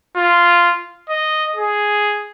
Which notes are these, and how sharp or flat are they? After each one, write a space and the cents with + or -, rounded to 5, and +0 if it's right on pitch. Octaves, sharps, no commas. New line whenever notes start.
F4 -10
D#5 -5
G#4 +0